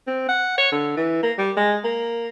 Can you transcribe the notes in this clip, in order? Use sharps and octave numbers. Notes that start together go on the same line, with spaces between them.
C4
F#5
C#5
D3
E3
A#3
G3
G#3
A#3